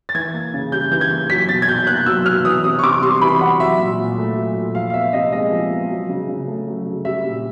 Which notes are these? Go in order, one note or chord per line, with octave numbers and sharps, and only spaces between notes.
A6
E3 G#6
A#3
C#3
G3 G6
E3 G6
G#6
A#3
F#3 B6
B2 A6
G#6
B2 G6
A#3 F#6
F#3 E6
B2 F6
E3 D#6
C3 D#6
C#6
C3 D6
G3 C6
E3 B5
C3 F#5
F#3 E5
A#2
A#2
A3
F#3
A#2
F3 F5
F5
B3 E5
C3 D#5
G#3 D#5
F3
B3
F#3
C#3
C#3
A3
F#3
C#3
G3 E5
A#2